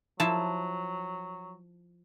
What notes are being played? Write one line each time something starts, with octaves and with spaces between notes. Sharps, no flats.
F3 F#3 E4 A5